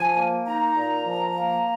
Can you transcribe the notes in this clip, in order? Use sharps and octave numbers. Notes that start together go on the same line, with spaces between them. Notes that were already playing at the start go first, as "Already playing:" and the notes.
Already playing: F3 G#5
A#3
D#4 A#5
A#2
F3
A#3